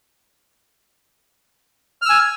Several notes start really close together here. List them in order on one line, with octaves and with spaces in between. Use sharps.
F6 E6 G#5